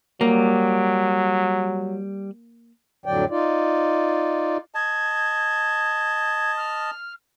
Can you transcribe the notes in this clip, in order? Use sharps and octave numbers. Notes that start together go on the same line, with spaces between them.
F#3 G3 A#3
F2 A2 D3 F#3 D5 G5
D#4 F4 D5
D#5 A5 G#6
F6